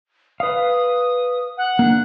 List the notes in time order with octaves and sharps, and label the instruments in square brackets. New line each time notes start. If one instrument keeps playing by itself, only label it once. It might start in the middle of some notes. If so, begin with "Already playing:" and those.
[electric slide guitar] B4 F5 [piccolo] D#6
[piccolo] F#5
[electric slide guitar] A#3 D4